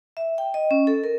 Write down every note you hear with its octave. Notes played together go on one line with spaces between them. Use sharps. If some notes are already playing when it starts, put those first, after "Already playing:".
E5
G5
D#5
C#4
A4
A#4